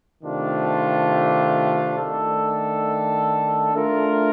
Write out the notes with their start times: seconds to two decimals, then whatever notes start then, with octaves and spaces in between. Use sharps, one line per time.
0.23 C3 D#3 A3 D4 F4
1.98 D#3 A3 D4 A4
3.74 A3 D4 F4 A#4